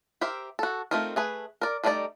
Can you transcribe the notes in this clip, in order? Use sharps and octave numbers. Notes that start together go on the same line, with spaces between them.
G4 A#4 C5 E5
F#4 A4
A3 C4 D#4 F4 A#4
A3 G#4 B4
A#4 D5
G3 A3 D4 D#4 D5